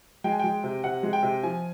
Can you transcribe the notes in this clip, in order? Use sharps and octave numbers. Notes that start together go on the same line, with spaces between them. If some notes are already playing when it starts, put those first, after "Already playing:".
G#3 G5
G#5
G#3 G5
C3
C3 F#5
G#3
G5
C3
F3 G#5